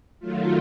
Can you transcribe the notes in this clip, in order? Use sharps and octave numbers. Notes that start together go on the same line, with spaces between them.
D#3 F#3 A3 F4